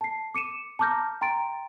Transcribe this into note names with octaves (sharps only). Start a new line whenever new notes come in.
A5 C7
D6 C#7 D#7 E7
A5 A#5 D6 F6 G6 A#6
G5 A#5 C6 A6 D7